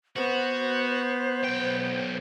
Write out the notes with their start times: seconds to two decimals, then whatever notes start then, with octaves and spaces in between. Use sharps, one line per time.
0.16 B3 F#4 C5
1.44 B1 G5